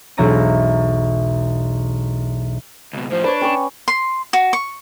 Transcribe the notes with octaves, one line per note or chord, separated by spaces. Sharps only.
E1 B1 E5 A#5 A#6 D#7
C#2 B2
A2 F3 C5
D4 B4 C#5
C#4 D5 G5 C#6
C6
F#4
C#6